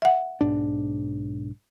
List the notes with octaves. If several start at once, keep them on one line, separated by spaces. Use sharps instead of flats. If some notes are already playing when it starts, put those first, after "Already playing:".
E5 F#5
B1 G#2 D4